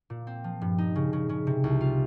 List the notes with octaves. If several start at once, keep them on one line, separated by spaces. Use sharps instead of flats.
A#2
C4
F3
G2
D#4
C#3
C#3
C#3
C3
C2
F4